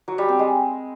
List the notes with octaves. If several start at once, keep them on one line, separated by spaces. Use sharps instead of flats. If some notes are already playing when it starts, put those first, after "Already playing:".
F#3
G3
C4
G#3